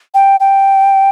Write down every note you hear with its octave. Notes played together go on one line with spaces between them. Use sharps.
G5
G5